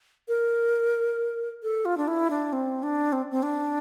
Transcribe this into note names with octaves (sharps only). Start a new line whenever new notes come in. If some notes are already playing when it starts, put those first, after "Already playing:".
A#4
A4
F4
D4
E4
D4
C4
D4
C4
C4
D4